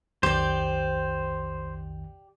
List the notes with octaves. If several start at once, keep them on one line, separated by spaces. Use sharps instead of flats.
B1 F2 D#3 G4 C5 D5